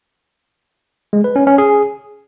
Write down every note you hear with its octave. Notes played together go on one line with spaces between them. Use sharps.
G#3
B4
C#4
C#4
G#4